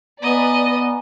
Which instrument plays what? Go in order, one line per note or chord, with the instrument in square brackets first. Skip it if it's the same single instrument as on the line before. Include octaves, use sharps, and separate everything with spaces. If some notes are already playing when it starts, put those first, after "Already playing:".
[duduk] B3 [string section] B4 D5 [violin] D#5 [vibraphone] G#5 A#5